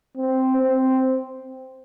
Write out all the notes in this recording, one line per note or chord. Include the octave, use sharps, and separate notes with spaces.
C4
C4